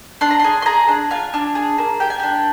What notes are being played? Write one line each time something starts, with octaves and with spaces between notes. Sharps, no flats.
D4 C6
A#5
G#4 C6
C6
G#4 A#5
D4
F4 G#5
D4
G#4
A#3
G4 G5
G#5
D4 G5